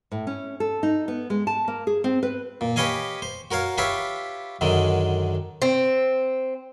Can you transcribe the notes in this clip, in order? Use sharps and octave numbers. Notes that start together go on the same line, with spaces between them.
A2
C#4
A4
D#4
B3
G#3
A5
A#3
G#4
C4
B4
A#2
G4 B4 C#5 D#5 F5 G#5
C5
F#4 A#4 C#5 F5
F4 G4 B4 C#5 E5 F5
F#2 D3 D#3 G#3
C4